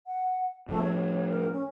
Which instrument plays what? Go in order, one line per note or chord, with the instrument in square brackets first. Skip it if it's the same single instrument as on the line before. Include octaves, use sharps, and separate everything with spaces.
[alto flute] F#5
[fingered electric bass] A2 F3 [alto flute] A3
[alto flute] C#5
A#4
C#4